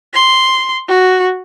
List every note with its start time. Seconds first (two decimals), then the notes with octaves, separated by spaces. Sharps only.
0.14 C6
0.88 F#4